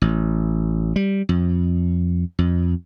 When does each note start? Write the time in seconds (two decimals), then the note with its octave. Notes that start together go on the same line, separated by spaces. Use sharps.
0.02 A1
0.96 G3
1.29 F2
2.39 F2